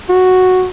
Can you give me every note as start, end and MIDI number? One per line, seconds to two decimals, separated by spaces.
0.09 0.67 66